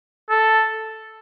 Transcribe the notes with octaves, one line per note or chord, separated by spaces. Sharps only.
A4